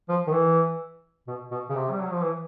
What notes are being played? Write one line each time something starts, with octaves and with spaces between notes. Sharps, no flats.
F3
D#3
E3
B2
B2
C#3
C3
G3
F#3
F3
E3